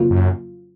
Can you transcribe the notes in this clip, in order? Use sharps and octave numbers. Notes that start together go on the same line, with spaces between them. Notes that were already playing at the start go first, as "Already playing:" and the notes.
Already playing: F2 C#3 F#3 A#3 F4
F#2